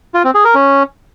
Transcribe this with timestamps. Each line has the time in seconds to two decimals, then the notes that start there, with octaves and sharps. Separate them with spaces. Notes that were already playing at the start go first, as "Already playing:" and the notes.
0.14 F4
0.24 C4
0.35 G#4
0.45 A#4
0.55 C#4